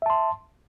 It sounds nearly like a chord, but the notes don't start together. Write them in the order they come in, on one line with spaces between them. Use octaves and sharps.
E5 A5 C6